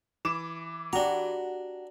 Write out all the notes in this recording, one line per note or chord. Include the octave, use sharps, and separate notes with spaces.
E3 D6 E7
D4 F#4 G4 A#5